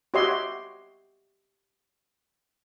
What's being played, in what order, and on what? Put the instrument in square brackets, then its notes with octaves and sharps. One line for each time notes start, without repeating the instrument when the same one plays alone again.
[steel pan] F#4 G4 C#5 D#5 E5 C6